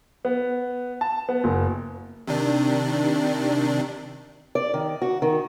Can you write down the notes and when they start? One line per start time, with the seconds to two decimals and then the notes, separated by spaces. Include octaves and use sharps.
0.25 B3
1.01 A5
1.29 B3
1.44 F#1
2.28 C3 D#3 D4
4.55 D5
4.74 D#3
5.02 F#4
5.22 D#3